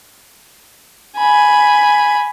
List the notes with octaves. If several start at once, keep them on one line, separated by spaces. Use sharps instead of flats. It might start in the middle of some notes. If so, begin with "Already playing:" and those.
G#5 B5